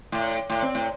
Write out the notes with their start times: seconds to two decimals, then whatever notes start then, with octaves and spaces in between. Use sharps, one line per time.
0.12 A2
0.50 A2
0.62 C4
0.75 A2